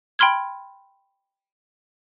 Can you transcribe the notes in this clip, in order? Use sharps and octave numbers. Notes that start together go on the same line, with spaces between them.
G5 B5 C6 F6 G#6